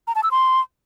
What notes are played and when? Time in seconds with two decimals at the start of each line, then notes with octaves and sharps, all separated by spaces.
0.07 A#5
0.15 A5
0.23 E6
0.31 C6